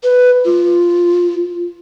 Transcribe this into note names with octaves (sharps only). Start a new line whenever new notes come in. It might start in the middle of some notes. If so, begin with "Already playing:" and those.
B4
F4